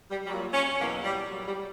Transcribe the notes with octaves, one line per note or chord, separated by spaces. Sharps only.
G3
A#2 F#3 G3
C#4
E2 B2 F#3 A#3
G3
A#2 F#3
G3